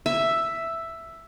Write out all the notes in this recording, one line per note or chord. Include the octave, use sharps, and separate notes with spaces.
E5